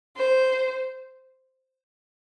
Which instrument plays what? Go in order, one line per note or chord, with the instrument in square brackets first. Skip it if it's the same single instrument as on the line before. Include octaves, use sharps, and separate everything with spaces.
[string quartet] C5